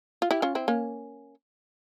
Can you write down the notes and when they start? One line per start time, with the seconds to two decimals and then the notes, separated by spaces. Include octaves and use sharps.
0.22 F4
0.31 E4 G4
0.42 C#4 F4
0.55 C4 E4
0.68 A#3 C#4